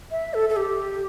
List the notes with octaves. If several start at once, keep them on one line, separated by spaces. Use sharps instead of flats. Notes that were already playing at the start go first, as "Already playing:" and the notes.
E5
A4
A4
G4